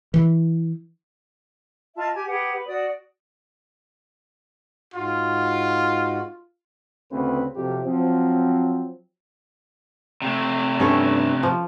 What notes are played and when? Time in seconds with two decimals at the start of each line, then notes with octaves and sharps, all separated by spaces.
0.14 E3
1.96 F4 D#5 E5 A5
2.14 G4 G#5
2.27 G4 G#4 B4 F#5
2.52 B4
2.67 F#4 D5 D#6
4.94 G#2 F4 F#4
7.12 D2 C#3 C4 B4
7.55 F2 C3 F#3 F4 G4
7.86 F3 F#3 C4
10.22 C3 A3
10.80 G2 C#4 A4 E5
11.43 F3